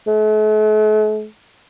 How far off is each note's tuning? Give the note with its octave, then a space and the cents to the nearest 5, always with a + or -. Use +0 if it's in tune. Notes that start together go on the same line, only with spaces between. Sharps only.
A3 -45